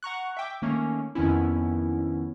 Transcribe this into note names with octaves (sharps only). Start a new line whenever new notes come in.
F#5 A#5 C#6 F#6
E5 G5 D6
D#3 A3 A#3 C#4
F2 D#3 B3 C#4 E4